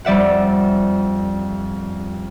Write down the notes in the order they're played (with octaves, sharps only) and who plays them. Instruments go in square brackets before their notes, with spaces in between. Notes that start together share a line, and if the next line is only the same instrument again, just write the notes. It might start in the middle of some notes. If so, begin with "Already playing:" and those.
[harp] F2 G3 D5 E5 F#5